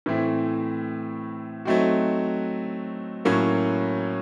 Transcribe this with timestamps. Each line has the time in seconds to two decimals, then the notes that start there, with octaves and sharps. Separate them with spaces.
0.06 A2 E3 A3 C4
1.65 F#3 A3 C4 D#4 F#4
3.25 A2 F#3 A#3 C#4 F#4